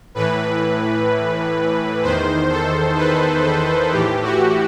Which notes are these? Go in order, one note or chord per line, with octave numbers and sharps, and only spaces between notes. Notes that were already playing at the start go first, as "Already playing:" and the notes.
A2 E3 B4
E2 D#3 C5
A4
B4
A4
A2 E3 G4
F#4